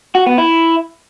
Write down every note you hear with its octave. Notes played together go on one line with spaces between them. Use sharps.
F#4
B3
E4